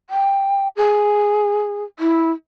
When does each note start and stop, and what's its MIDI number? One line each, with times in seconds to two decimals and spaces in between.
0.10 0.68 79
0.76 1.84 68
1.99 2.31 64